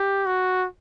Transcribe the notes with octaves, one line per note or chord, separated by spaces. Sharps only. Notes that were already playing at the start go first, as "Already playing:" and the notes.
Already playing: G4
F#4